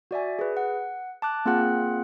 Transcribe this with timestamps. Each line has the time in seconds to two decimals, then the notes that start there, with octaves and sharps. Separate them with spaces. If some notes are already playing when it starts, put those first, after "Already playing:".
0.11 F#4 D5 E5 G#5
0.39 G#4 B4
0.57 F#5
1.22 A5 D6 F#6
1.45 A#3 C4 F4 G#4 F#5 F#6